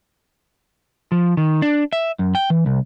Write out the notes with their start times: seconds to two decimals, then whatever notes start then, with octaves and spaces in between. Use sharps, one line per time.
1.12 F3
1.37 D#3
1.62 D4
1.93 E5
2.19 F#2
2.35 G5
2.50 E3
2.66 C2